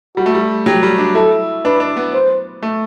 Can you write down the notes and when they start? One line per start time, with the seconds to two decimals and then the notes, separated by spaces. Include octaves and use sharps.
0.17 G3 F#4
0.26 A3
0.35 G3
0.66 F#3 G4
0.83 G3
0.98 D4
1.15 E4 A4
1.65 D4 B4
1.80 D4
1.97 B3
2.14 C5
2.63 A3